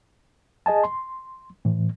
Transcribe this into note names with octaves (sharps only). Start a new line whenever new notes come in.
G#4 D#5 G#5 A5
C6
A2 E3